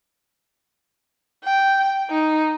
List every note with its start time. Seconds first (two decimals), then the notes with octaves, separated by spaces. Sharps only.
1.44 G5
2.10 D#4